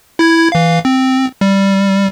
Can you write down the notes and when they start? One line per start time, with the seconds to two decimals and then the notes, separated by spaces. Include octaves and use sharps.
0.19 E4 G#6
0.52 E3 F5
0.85 C4
1.41 G3